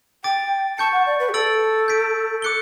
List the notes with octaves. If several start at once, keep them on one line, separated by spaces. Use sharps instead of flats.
G5 D6 A6 D7
A5 C#6 G6 C#7
F#5
D5
B4
G4
A4 E6 A6 D7 F#7
G6 B6 D7
D6 F#6 C#7 G7